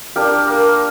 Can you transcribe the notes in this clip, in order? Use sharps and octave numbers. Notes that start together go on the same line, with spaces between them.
D4 G4 A#4 F5
A#3 A#4